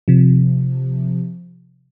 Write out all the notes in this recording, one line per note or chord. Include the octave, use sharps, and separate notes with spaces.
C3 F3